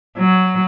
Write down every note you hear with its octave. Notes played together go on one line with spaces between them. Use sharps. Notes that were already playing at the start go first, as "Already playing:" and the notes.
F#3